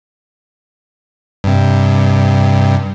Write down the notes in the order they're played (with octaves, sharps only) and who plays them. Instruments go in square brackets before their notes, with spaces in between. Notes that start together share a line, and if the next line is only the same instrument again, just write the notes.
[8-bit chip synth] G2 C3